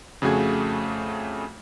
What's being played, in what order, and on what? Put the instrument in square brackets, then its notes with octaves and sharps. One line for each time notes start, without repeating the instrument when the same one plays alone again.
[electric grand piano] F2 C#3 A3 F#4 G#4 G#6